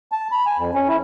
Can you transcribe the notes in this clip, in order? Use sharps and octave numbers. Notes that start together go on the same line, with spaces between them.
A5
B5
G#5
F2
C#4
E4